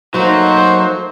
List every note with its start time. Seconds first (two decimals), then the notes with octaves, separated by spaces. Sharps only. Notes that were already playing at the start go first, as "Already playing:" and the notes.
0.14 F#3 A3 A#3 D#4 F#4 C5